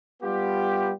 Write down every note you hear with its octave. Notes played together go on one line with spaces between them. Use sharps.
G3 B3 F4 G4